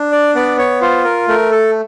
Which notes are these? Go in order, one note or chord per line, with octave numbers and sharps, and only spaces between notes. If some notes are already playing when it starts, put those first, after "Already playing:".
Already playing: D4
D5
B3 D5
C#5
F4 C5
A#4
A3 A#4
A4